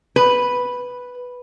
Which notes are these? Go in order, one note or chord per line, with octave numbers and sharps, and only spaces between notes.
B4